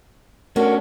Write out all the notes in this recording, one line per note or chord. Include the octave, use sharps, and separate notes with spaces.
A3 C#4 D4 F#4 A#4